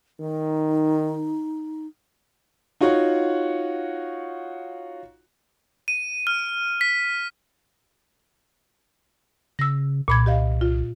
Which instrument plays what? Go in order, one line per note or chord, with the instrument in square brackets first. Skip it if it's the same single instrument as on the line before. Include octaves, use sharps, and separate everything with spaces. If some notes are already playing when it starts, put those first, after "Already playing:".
[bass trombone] D#3 [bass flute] D#4
[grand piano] D#4 F4 F#4 C#5 F#5
[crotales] D#7
F6
B6
[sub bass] C#3 [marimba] E6 A#6
[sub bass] C2 [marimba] A#2 B5 G#6
[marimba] G4 D#5 F5
F4